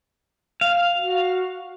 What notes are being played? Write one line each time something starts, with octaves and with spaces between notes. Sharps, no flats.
F5
F#4